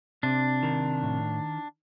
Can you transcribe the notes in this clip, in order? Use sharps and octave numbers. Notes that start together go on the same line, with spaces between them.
C3 D4
D#3
A2